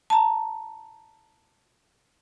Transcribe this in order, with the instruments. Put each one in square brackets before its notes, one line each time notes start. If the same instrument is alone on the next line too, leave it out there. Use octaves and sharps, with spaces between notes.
[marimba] A5 A#5